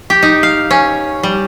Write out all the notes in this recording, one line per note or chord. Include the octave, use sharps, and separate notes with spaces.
G4
D#4
F5
C#4
G3